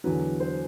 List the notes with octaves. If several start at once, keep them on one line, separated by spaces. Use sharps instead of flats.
E2 D3 F#3 B4
C5